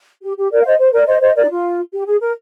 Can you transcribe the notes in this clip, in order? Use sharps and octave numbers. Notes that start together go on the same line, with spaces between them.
G4
G4
A#4 D5
F5
C5 D#5
C5
A#4 D5
C5 D#5
C5 D#5
A#4 D5
D#4
F4
G4
G#4
A#4